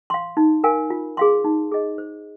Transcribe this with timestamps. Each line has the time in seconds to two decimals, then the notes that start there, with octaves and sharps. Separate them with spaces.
0.10 F5 C6
0.37 D#4
0.64 A#4 F5 G#5
0.90 F4
1.17 G#4 F5 C6
1.44 D#4
1.72 G#4 D#5
1.98 C5